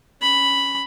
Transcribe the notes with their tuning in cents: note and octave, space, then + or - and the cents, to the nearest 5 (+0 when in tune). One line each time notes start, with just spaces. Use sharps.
C#4 -10 B5 +0